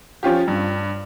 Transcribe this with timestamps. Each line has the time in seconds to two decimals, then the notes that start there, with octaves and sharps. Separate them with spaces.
0.23 F3 C#4 F4 G4
0.48 G2